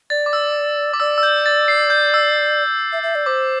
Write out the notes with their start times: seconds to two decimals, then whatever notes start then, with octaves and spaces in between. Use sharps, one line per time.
0.10 D5 A6
0.26 D6
0.33 E6
0.93 D6
1.00 D5 E6
1.18 E6
1.23 G6
1.46 A6
1.68 C7
1.90 G6
2.14 E6
2.93 E5
3.03 E5
3.15 D5
3.26 C5 D6